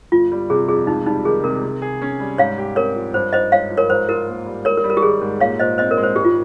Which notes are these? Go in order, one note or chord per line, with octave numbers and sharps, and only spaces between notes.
G1 F4
G3
C3 G#4
F2 G#4
C#2 D#4
G3 D#4
D#3 G#4
C3 A#4
C3
G#4
C#4
G3
G#2 C#5 F5
G4
C4 A#4 C#5
F3
G2 C5
D#4 C5 D#5
G#3 C#5 F5
F3
A#4 C#5
G#2 C5
F4 A#4
A#3
G3
G#1 A#4 C#5
A#4
G3
A#4
G4
D#3 G#4
G#2
A#2 C#5 F5
A#2 C5 D#5
C4 C5 D#5
A#4 C#5
G#3
C5
G#1 G4
F4